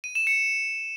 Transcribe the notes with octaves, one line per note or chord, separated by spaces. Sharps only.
D#7
E7
C#7